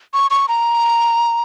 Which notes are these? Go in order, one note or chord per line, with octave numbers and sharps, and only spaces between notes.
C#6
C#6
A#5